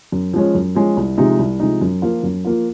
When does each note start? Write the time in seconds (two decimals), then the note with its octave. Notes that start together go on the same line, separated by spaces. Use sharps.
0.12 F#2
0.33 F3 G#3 C#4
0.55 F#2
0.75 F3 G#3 C#4
0.97 C2
1.18 C3 F3 G#3 D#4
1.39 C2
1.60 C3 F3 G#3 D#4
1.81 F#2
2.02 F3 A#3 F4
2.23 F#2
2.45 F3 A#3 F4